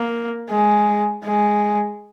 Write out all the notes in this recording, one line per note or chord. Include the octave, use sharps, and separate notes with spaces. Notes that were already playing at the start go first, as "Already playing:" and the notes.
Already playing: A#3
G#3
G#3